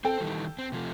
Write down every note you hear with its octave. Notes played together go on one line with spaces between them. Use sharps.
C4 A4 C5 G5
D#3 E3 G3
C4
C3 F3 A3